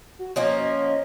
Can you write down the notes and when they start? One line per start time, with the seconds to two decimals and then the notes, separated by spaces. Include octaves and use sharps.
0.19 F#4
0.36 F3 A#3 C#4 D#5